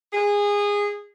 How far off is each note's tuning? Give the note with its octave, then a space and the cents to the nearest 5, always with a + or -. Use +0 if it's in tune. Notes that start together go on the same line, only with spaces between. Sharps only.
G#4 -20